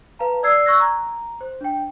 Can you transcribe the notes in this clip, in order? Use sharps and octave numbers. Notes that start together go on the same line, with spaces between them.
B4 F5 A5 A#5
D5 D#6 E6 G#6 C7
C#6 E6 F#6 G#6 A#6
A#5
C5
D4 G5